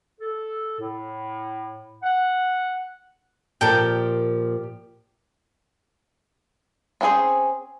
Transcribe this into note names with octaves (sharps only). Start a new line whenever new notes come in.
A4
A2
F#5
A#2 F3 G4 A4 A#4 G5
C4 C#4 F#4 G#4 C5